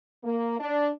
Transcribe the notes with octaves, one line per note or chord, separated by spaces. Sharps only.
A#3
D4